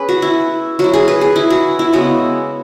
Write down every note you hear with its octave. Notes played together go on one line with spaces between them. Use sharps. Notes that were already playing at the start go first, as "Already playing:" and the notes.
Already playing: C#4 G#4 B4
F#4
E4
F#3 E4 F#4
G#4
B4
G#4
E4
F#4
E4
C#3 G#3 B3 E4 F#4